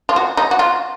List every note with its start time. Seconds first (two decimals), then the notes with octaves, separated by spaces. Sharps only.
0.09 F4
0.16 F#4
0.37 D#4
0.51 F#4
0.59 F4